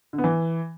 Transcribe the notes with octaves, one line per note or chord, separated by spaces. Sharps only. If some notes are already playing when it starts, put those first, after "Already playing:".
D3
B3
E3